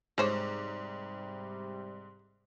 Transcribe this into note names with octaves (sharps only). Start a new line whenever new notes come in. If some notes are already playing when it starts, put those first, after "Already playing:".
G#2 C3 G3 G#3 C5 C#5 D6